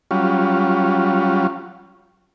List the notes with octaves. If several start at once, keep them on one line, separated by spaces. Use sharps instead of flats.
F#3 G3 C#4 F4